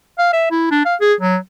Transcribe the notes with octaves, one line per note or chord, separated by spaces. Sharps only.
F5
E5
E4
D4
F5
G#4
F#3